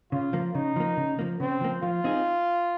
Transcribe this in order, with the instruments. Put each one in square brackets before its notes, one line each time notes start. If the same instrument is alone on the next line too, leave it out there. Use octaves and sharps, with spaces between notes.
[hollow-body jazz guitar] C#3 [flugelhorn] F4
[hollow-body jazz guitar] F3 A#3
[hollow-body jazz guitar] C#3 [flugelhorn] D#4
[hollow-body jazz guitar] F3 A#3
C#3
F3 A#3
[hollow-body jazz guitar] C#3 [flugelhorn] C4
[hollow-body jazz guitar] F3 A#3
[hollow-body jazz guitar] F3 [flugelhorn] F4
[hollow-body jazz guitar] C4 D#4 G#4